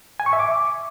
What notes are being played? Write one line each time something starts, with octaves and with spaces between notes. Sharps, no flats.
G#5
C#6
E5
D6